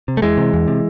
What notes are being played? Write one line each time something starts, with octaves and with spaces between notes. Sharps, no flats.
C3
A3
E2 E3 G#3
C3
E2
C3